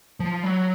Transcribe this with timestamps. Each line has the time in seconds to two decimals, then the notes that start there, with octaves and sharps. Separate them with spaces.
0.20 F3
0.43 F#3